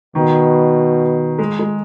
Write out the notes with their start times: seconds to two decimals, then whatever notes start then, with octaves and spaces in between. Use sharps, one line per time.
0.15 B2 D#3
1.39 G#3
1.59 G#3